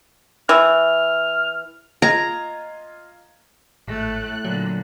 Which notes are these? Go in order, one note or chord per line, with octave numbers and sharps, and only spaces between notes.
E3 F6
F4 D#5 A#5 G#6
G#1 A2 A3 F#6
A#2 D3 F#3